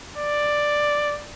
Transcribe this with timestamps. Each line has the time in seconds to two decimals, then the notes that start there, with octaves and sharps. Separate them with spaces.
0.18 D5